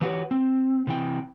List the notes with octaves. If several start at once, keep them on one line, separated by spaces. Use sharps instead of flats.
E3 F#3 F#4 G4 B4 C#5
C4
C3 E3 G5